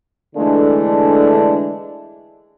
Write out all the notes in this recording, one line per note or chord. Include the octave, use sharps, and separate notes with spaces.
D3 E3 G#3 A3 D4